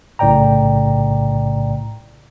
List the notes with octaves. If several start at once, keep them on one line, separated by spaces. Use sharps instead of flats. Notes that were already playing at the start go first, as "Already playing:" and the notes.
B1 A2 C#3 D5 G5 A#5